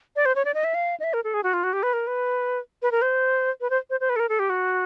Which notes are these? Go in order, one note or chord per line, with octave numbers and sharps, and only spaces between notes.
D5
C5
C#5
D5
D#5
E5
F5
D#5
E5
A#4
A4
G#4
F#4
F4
F#4
G4
B4
A#4
B4
B4
A#4
C5
B4
C5
C5
C5
B4
A4
A#4
A4
G4
F#4